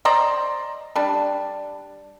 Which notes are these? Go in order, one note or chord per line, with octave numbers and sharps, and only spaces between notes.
C5 D5 D#5 A#5
G3 D4